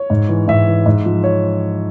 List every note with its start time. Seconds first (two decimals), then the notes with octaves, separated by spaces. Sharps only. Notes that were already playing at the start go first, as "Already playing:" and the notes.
Already playing: C#5
0.10 G#2
0.29 E3
0.48 G#2 E5
0.68 E3
0.86 G#2
1.06 F3
1.24 C#5